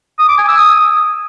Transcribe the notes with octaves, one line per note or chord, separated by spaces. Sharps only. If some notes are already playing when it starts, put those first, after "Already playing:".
D#6
D6
G#5
E6
D#6